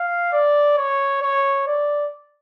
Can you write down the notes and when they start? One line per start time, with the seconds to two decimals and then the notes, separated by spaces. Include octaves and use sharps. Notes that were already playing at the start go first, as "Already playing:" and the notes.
Already playing: F5
0.32 D5
0.77 C#5
1.22 C#5
1.67 D5